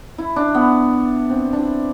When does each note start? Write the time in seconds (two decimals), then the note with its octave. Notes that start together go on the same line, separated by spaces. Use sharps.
0.18 E4
0.36 D4
0.55 B3
1.29 C4
1.53 D4
1.58 E4